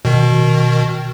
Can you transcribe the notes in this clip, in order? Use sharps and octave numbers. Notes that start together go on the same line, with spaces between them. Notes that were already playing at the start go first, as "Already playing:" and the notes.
B2 D#3